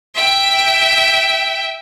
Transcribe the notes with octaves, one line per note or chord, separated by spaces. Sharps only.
E5 G5